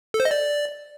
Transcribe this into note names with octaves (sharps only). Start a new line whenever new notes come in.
A4
C5
D#5
D5